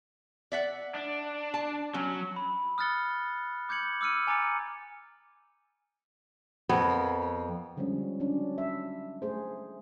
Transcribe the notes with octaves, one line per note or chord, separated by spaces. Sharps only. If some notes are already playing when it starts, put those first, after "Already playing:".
D5 E5 F#5
D4
A5
F#3 C#4
B5
D#6 F6 F#6 A6 C#7 G7
D6 G6 G#6 C#7 F#7
D6 E6 F6 C#7 D#7
G#5 A#5 D6 A6 C#7
F2 B3 A#4
D3 F3 G3 G#3 C#4
F#3 C#4 D4
E5
A3 G#4 C5